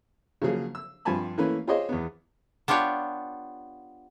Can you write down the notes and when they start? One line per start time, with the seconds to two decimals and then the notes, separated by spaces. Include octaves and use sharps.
0.42 C#3 F3 F#3 A#3 G#4
0.75 E6
1.05 G2 F3 C4 G#5 A5 B5
1.38 E3 A3 A#3 C#4 E4 B4
1.68 F4 G4 G#4 C5 C#5 D#5
1.89 E2 B3
2.68 B3 D4 F4 G4 C#5